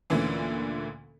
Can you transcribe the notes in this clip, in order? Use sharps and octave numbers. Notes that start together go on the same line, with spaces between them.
D2 A#2 D3 E3 C#4